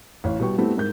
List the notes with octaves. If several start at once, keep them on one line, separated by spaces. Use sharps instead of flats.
A1 C#5 F5
B2 G3 B4 G5 C#6
A3 B3 C4 E4 G4
G#2 A#4 G6